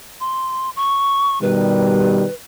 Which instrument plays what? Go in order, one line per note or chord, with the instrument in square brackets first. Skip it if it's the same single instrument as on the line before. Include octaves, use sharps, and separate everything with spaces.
[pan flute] C6
C#6
[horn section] B2 D#3 G3 [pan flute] B4